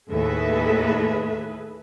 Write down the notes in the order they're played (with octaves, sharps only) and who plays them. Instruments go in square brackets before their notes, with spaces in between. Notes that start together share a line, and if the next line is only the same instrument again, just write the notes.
[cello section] D#2 A2 E5 [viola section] G#4 A4 B4